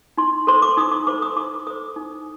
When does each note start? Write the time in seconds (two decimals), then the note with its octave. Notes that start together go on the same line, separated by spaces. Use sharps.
0.18 D#4 C6
0.47 A4 C5 C6
0.62 D6
0.77 D#4 D#6
0.92 D6
1.07 A4 C5 D6
1.22 D#6
1.36 D#4 D6
1.67 A4 C5 D#6
1.96 D#4